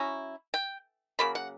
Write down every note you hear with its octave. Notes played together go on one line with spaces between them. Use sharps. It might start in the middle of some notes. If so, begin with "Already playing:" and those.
Already playing: F#3 C#4 E4 A#5
G5
C#3 F#3 A#3 B5
F#5